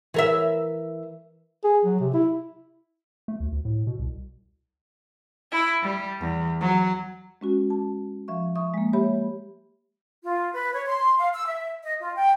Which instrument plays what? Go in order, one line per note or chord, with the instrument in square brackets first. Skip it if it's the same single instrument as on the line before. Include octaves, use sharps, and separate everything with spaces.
[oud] E3 A#4 E5
[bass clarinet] G#4
F#3
C3
E4
[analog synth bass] A3
D2
D2
A2
B2
C2
[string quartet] E4
G3
E2
F#3
[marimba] G#3 C#4 F#4
A5
F3 E5 C#6
E5 C#6 D#6
G#3 A#3
G4 C#5 E5 B5
[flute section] F4
B4
C#5
C6
F5
E6
E5
D#5
F4
G5